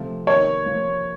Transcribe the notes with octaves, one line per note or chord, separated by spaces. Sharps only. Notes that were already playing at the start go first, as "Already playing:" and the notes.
Already playing: C3 F3 A3
C3 D#3 A#3 D#4 C#5
C3 F3 A#3